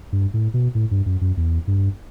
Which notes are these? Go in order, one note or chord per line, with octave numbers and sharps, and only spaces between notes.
G2
A2
B2
A2
G2
F#2
F#2
E2
G2